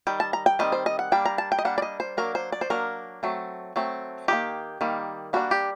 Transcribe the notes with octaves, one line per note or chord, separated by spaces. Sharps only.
D#3 G3 G5
A5
A#5
G5
D#3 G3 C4 D#5
C5
D#5
F#5
G3 A#3 D4 G5
A#5
A5
G5
D#5
G3 A#3 D4 F#5
D5
D#5
C5
F#3 A#3 D4 A#4
C5
D5
C5
F#3 A#3 D4 A#4
F#3 A3 C4
F#3 A3 C4
D#3 G3 A#3 G4
D#3 G3 A#3
G3 A#3 D4 F#4
G4